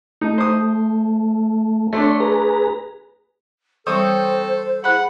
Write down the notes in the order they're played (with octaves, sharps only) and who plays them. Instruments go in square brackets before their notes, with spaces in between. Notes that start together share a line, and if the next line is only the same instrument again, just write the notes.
[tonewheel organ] A3 [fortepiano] D#4
[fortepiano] C5 D#6
[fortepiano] A3 D4 [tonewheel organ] C#5 C6
[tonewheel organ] G#4 B4 A#5
[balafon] E3 G3 [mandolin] C4 C#5 D#6 [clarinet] A4 [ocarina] C5
[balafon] E4 G#4 [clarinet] F#5 [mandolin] B5 F#6